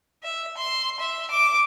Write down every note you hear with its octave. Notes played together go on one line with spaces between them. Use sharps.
E5
C6
E5
D6